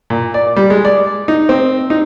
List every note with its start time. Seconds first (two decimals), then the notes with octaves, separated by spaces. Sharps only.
0.10 A#2
0.34 D5
0.56 G3
0.70 G#3
0.85 D5
1.28 D#4
1.49 C4
1.90 D#4